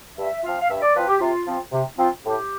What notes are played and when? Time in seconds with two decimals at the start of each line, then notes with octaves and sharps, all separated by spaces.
0.17 G2 E5
0.43 F3 C4 F4 F5
0.61 F5
0.69 G2 E5
0.81 D5
0.95 F3 C4 F4 B4
1.08 G4
1.20 C3 F4
1.46 F3 C4 F4
1.72 C3
1.97 F3 C4 F4
2.24 A2 G4